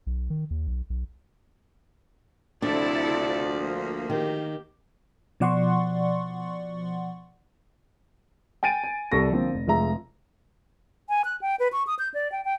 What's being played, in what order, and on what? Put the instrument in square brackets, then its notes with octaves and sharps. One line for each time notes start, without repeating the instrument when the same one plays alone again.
[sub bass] B1
D#3
D#2
B1
B1
[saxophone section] D2 F3 [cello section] C3 E4 A4 [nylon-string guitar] D4 [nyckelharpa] D5
[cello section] A#3
[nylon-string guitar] D#3 [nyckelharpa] G4
[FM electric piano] B2 F3 D5 F#5 C6 C#6
[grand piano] G5 G#5 A6 D7 D#7
G#5
C2 G3 A4 C#6 A#6
D3 F3 A#3 C4
F1
F1 F3 G#3 E5 A#5
[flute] G#5
F#6
G5
B4
C#6
D#6
G6
D5
G5
G5